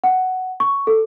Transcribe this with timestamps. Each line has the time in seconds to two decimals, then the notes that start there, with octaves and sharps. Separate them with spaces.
0.04 F#5
0.60 C#6
0.87 A4